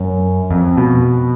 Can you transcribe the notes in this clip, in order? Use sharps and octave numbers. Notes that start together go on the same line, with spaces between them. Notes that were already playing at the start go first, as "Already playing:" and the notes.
Already playing: F#2
F2
B2